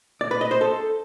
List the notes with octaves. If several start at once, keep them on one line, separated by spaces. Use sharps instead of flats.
D5
B4
D#5
C5
A4